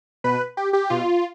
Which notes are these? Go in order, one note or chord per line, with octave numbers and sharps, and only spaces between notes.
B2 B4
G4
G4
B2 F4